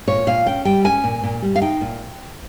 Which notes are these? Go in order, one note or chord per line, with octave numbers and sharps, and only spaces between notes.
A#2 C#5
A#2 F5
C#4 G5
G3 G5
C#4 G#5
A#2
A#2
G3
F5
D#4 G5
A#2